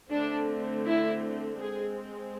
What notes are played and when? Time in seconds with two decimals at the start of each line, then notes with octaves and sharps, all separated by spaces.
0.11 D3 A3 C4 D4
0.85 E4
1.59 G#3 C4 G#4